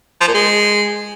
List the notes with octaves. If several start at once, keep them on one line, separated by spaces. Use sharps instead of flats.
F3
A#2
G#3